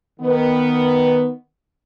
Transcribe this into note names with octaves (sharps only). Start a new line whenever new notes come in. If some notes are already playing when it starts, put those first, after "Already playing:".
D#3 B3